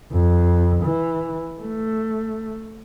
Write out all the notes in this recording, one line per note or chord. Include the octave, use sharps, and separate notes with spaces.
F2
E3
A3